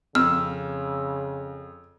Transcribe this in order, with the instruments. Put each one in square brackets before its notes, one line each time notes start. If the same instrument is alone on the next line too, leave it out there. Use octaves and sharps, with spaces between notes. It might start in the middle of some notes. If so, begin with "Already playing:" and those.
[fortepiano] F2 [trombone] C#3 [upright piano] E6 [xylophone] F6